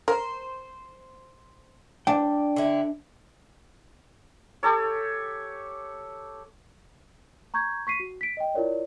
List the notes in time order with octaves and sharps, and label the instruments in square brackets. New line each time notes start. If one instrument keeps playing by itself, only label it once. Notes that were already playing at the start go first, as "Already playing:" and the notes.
[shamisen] A#4 [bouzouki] C5
[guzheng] D4 [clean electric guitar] D5 G5
[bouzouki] D3 E4
[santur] G4 A4 C#5
[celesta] A#5 C#6 G6 G#6
C#6 B6 C7 D#7
F#4
B6 D7
D#5 G5
E4 F4 A#4 C#5 D5